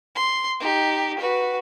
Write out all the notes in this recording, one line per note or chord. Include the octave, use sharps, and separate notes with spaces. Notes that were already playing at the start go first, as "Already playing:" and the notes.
C6
D#4 G4
F#4 B4